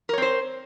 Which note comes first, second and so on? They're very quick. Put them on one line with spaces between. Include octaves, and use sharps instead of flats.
A#4 C#5 C4 C5